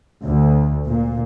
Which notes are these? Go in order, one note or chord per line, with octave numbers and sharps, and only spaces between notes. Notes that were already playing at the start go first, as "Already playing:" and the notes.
D2
A#2